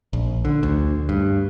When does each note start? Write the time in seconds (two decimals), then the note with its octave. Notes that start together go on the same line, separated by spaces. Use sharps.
0.13 A#1
0.45 D3
0.63 D2
1.09 G2